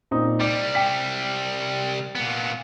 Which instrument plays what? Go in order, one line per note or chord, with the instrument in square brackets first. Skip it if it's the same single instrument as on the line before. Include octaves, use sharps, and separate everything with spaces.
[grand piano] A#2 C4 D#4
[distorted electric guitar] C2 G3 [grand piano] D5
[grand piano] G5 B6
[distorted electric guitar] A#2 B3